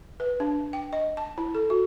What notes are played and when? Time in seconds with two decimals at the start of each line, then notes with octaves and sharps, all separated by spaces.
0.20 B4
0.40 D4
0.73 G5
0.93 D#5
1.17 A5
1.38 E4
1.55 A4
1.70 F#4